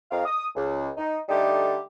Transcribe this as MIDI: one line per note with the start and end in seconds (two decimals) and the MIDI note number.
0.11 0.25 41
0.11 0.25 70
0.11 0.25 75
0.11 0.25 77
0.26 0.47 87
0.56 0.89 37
0.98 1.17 63
1.29 1.79 50
1.29 1.79 55
1.29 1.79 57
1.29 1.79 63
1.29 1.79 67